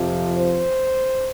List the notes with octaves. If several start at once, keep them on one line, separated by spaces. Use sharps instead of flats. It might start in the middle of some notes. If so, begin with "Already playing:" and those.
Already playing: F2 C3 F3
C5